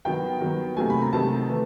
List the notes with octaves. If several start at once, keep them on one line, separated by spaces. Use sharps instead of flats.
D#3 F#3 B3 G5
D#3 F#3 B3
C3 D#3 F#3 A3 G#5
B5
A#5
C3 D#3 F#3 A3 A5
E3 A3